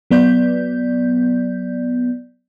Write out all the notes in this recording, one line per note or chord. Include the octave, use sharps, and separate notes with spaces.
F#3 B3 D5 G6